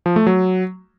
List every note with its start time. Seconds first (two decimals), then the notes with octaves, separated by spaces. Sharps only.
0.06 F3
0.16 A3
0.27 F#3